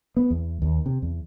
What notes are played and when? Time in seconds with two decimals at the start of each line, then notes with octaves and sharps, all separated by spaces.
0.17 B3
0.31 E2
0.62 D#2
0.86 C3
1.02 E2